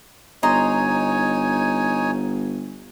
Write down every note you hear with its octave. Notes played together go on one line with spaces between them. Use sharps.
G1 D#4 C#5 D#5 G#5 A#5 C6